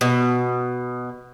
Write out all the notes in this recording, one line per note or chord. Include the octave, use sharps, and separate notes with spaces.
B2